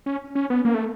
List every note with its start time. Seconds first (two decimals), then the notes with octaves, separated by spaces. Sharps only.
0.06 C#4
0.35 C#4
0.50 B3
0.65 A#3
0.74 A3